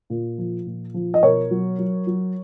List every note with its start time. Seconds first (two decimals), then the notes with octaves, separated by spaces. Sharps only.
0.10 A#2
0.38 F3
0.66 A#2
0.94 F3
1.14 D#5
1.23 B2 A#4 C#5
1.51 F#3
1.79 F#3
2.07 F#3